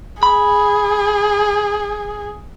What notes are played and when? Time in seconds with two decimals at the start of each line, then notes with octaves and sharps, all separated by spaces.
0.23 G#4 B5